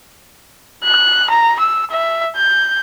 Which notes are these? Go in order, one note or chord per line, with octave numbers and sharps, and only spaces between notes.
F#6
A#5
E6
E5
G6